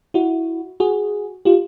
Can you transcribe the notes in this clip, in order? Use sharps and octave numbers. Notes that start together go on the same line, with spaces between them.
E4 F#4
F#4 G#4
F4 G4